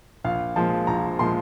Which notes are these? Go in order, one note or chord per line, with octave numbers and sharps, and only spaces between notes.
A#1 F5
A#2 F3 G#3 A5
A#1 A#5
A#2 F3 G#3 C6